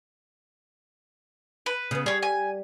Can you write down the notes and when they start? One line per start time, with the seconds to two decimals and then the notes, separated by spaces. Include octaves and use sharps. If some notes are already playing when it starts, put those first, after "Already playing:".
1.66 B4
1.91 C#3 B3
2.06 G3 G#4 C#5
2.22 G#5